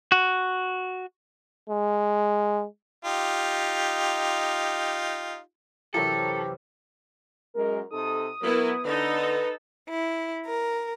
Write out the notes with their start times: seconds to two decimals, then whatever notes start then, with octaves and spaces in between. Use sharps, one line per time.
0.12 F#4
1.69 G#3
3.05 D#4 F4 G4
5.94 F#2 C3 E3 E4 G4 A4 A#4 C#5
7.54 F#2 G#3 A#4
7.91 C3 D#4 A4 D#6
8.41 F#3 B3 E4 A#4
8.85 D3 D#4 A4 B4
9.88 E4
10.46 A#4